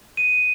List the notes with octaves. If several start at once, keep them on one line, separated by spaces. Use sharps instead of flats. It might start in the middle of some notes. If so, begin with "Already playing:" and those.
D#7